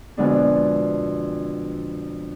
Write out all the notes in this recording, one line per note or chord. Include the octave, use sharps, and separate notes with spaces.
F2 B2 D3 G#3 D4